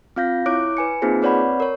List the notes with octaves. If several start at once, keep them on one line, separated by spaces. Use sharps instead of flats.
C4 F4 F5 G6 A#6
E4 C#5 D6 F#6 D7
B4 G#5 C#7
A#3 C4 D#4 F4 G#4 C5
C4 B4 C#5 D5 F#5 B5
A#4 C#5